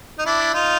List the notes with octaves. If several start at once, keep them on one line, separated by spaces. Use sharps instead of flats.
D#4
D4 E4
D#4 F4